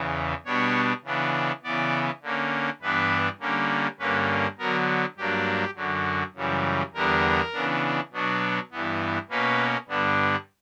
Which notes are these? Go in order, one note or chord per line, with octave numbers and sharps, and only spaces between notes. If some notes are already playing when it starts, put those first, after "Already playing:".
Already playing: E2 C#3 E3
B2 G3 B3 D4 C#5
C#3 E3 B3 D4
C#3 E3 B3 D5
D3 A#3 C#4
G2 E3 B3 D4 B4
D3 G3 A#3 C#4
G2 D3 A#3 C#4 B4
D3 F#3 B3 A#4
G2 F#3 A#3 D4 G4
F#2 D3 F#3
F#2 C#3 E3 G3
E2 D3 G3 B3 D4 A#4
C#3 E3 B3 D4
B2 F#3 B3 D4
G2 E3 B3
B2 A#3 C#4 B4
G2 D3 G3 B3 D4